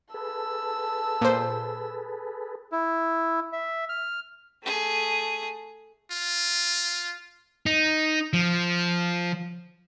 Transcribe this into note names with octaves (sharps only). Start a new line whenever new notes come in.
G#4 A4 B4 A5 E6
A#2 C5
E4
E5
F6
A3 G#4
F4
D#4
F3